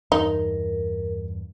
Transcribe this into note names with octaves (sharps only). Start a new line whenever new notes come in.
E2 G2 D#4 A#4